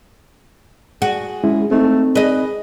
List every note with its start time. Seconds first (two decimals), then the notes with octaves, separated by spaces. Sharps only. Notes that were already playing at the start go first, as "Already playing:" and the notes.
1.02 F#4 G#4
1.44 G#3 C#4 E4
1.71 A3 C4 D#4
2.15 G#4 B4 D#5